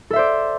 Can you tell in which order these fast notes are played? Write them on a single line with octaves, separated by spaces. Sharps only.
A4 E5 C5 D5